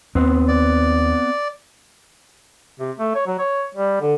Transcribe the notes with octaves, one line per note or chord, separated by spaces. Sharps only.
D#2 B3 C4
D5
C3
A3
C#5
F#3
C#5
G3
D3